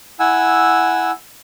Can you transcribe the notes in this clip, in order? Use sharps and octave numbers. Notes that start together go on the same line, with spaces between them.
E4 F#5 G#5 E6